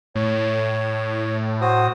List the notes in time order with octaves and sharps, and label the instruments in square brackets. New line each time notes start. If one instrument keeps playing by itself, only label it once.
[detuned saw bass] A2 [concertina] C#5
[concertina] F#4 C5 D#6